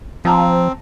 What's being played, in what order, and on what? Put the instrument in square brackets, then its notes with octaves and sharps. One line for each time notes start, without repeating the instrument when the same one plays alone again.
[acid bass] F3 [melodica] C4 [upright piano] A5 A#5